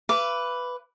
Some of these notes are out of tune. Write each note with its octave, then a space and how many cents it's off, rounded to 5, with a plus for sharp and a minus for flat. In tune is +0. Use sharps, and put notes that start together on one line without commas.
B4 +5 F5 -45 D6 -15